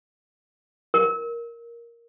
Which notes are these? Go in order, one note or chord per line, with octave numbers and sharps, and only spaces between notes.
A#4